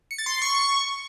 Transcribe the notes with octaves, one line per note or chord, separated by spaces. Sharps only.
C#7
A6
C6
C7
C#6